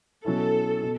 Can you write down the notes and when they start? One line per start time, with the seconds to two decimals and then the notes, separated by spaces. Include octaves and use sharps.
0.25 B2 F#3 C#4 E4 A4
0.83 B2